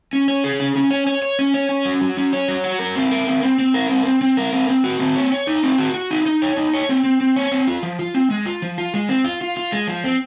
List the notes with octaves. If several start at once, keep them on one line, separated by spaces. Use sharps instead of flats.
C#4
C#5
G#4
C#4
C#4
C#5
C#5
C#5
C#4
C#5
C#4
F#3
F#3
C#4
C#5
F#3
F#4
A#4
C4
A#4
C4
C4
C4
A#4
C4
C4
C4
A#4
C4
C4
F#4
C4
C#5
C#5
D#4
C4
F#4
F#4
D#4
D#4
C#5
D#4
C#5
C4
C4
C4
C#5
C4
F4
F3
F4
C4
G#3
F4
F3
F4
G#3
C4
F4
F4
F4
G#3
F3
C4